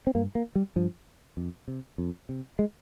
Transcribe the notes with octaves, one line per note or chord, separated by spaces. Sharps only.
C4
G2 A#3
A#3
G3
G2 F3
F2
C3
F2
C3
G#3